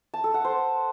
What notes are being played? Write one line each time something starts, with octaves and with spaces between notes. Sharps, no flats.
A5
A4
F#5
C5